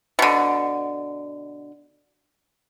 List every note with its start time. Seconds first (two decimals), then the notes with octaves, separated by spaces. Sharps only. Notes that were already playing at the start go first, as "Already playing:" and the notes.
0.19 B2 D3